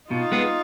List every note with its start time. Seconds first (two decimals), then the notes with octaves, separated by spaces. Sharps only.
0.10 B2 D#4 F4
0.32 G#3 B3